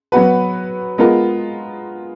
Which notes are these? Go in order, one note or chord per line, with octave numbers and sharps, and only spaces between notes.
F#3 B3 F#4 B4
G#3 B3 F4 A#4